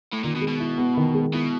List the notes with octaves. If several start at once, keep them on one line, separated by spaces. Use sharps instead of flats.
A2
A#2 D#3
B2
G#3
B2
E4
B3
D#3
G#3
B2 E4